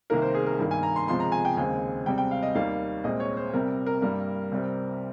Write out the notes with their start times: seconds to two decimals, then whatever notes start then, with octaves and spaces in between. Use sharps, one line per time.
0.10 C2 C3 D#3 A#3 A#4
0.22 C5
0.34 G#4
0.46 A#4
0.59 G2 D#3 A#3
0.71 G#5
0.83 A#5
0.96 C6
1.08 C#2 C3 F3 G#3 C6
1.20 A#5
1.32 G#5
1.45 G5
1.57 D#2 C#3 G#3 C4 G#5
2.06 C#2 C3 G3 C4 G5
2.18 G5
2.31 F5
2.43 D#5
2.55 D#2 D#3 G3 A#3 F5
3.04 C2 A#2 G#3 C4 D#5
3.20 C#5
3.37 C5
3.53 C2 C3 G3 C4 A#4
3.86 A#4
4.02 G2 G3 A#3 A#4
4.52 C2 C3 G3 C4